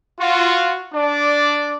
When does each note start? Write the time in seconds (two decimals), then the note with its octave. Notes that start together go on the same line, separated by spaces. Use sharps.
0.18 F4 F#4
0.93 D4 D5